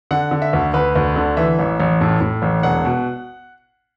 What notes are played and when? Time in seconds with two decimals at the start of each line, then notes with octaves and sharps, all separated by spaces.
0.11 D3 F#5
0.31 D3
0.42 E5
0.53 D2
0.74 D2 B4
0.95 D2
1.16 D3
1.37 E3 E5
1.59 A1
1.80 A1
2.01 A2
2.21 A2
2.42 A1
2.63 E1 F#5
2.85 B2